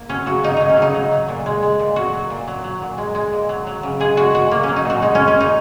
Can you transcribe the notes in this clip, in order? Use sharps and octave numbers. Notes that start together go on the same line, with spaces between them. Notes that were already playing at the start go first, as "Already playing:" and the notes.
Already playing: A#3
F#3 C#4
C#3 F#4
F#3 D#4
F#3 D#4
C#4
C#3 D#4
F#3
F#3
A#2
G#3
G#3
A#2
F#3 F#4
F#3
A#2
F#3
F#3
A#2
G#3
G#3
A#2
F#3
F#3
C#3
G#3 G#4
G#3 F#4
A#2 F#4
F#3 A#3
F#3 C#4
D#4
A#2 F#4
G#3 D#4
G#3 C#4
C#4
A#2 D#4